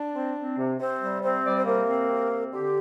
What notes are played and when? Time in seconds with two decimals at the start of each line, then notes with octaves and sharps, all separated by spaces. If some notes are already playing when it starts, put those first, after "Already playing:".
Already playing: D4 D5
0.14 C4
0.35 C4
0.57 C3
0.79 C3 C4 C5
1.01 G3
1.22 C3 C4 C5
1.44 G3 D5
1.56 C5
1.65 C3 A#3 A#4
1.87 C4
2.08 C3
2.30 C4
2.52 D3 G4